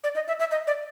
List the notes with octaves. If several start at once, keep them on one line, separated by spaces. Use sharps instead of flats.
D5
D#5
E5
E5
D#5
D5